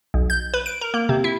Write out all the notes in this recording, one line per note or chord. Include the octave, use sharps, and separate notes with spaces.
B1
G6
B4
D7
A#4
A#3
C3
E4